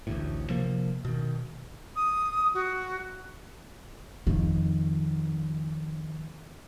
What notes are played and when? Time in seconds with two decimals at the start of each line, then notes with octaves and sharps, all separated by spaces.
0.07 A1 D2 A2
0.49 C3 F3 A#3
1.05 B2 D#3
1.96 D#6
2.54 F#4
4.27 F2 D#3